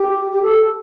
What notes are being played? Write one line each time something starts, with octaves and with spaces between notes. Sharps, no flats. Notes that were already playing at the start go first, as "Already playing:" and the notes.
Already playing: G4
G4
A4